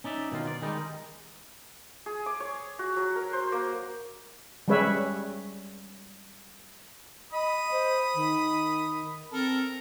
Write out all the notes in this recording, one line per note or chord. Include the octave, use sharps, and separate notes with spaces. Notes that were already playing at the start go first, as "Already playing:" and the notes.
C#4 D#4 D5 E5
B2 D#3 D#4 F4
D5
D#3 G3 G#3 D#4
G#4
D6
C#5
F#4
F#3
A#4
C5
A#3
G3 G#3 C#4 B4 C#5 E5
D#5 B5 D#6
C5
D#3
C4 A4 A#4